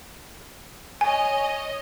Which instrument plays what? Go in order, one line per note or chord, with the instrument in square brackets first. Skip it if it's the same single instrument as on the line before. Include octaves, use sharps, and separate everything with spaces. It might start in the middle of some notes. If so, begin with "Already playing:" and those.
[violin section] C#5 D#5 [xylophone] G#5